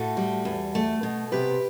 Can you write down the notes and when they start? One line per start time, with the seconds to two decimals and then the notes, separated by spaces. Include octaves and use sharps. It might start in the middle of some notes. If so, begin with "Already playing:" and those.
Already playing: A2 F#4 A4
0.17 G3
0.45 E2
0.75 A3
1.03 B2
1.32 C3 G4 B4